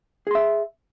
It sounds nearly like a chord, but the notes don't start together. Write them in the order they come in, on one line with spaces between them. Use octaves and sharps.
G#4 C6 E5